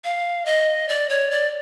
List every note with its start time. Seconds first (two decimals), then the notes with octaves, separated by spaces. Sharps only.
0.04 F5
0.46 D#5
0.89 D5
1.09 C#5
1.31 D5